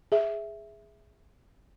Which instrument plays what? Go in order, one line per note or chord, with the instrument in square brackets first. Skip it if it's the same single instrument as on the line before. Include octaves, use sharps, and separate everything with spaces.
[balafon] G#4 E5